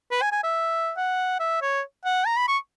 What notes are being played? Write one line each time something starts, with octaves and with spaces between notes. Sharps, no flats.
B4
G#5
G#5
E5
F#5
E5
C#5
F#5
A#5
B5
C#6